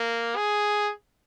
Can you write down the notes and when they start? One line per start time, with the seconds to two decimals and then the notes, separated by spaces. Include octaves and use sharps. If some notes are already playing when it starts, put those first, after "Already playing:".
Already playing: A#3
0.36 G#4